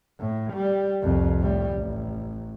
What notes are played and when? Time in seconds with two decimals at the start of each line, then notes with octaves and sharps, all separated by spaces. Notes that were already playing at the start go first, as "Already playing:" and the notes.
0.20 A2
0.53 G3
1.03 C2 F2
1.40 A2 G3
1.73 A1